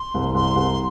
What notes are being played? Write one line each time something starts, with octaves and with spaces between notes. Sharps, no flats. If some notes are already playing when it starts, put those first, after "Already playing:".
Already playing: C6
C2
C2 C6
C2